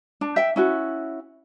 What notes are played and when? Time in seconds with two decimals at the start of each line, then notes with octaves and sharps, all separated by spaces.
0.21 D4
0.36 E5 G5
0.56 C#4 E4 F#4